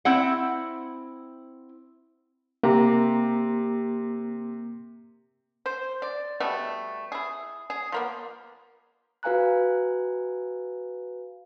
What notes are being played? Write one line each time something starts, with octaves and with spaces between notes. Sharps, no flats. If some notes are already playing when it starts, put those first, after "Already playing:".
C4 E4 F#5
C3 A#3 A#5
C5
D5
B2 G3 A3 B3
E4 G#4
G#4
F3 A#3 B3
F#4 B4 F5 G#5 A#5 F#6